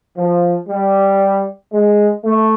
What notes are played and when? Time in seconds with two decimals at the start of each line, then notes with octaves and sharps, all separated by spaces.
0.16 F3
0.68 G3
1.72 G#3
2.23 A3